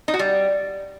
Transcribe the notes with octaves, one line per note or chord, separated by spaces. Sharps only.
D#4
F#4
G3